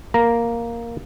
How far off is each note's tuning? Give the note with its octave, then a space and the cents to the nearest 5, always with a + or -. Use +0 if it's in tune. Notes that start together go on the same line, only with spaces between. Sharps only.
A#3 +0 A#5 +0